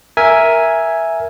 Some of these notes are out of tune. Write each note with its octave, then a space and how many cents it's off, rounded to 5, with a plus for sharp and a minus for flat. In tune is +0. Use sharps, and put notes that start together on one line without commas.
A#4 +5 E5 +0 G#5 +0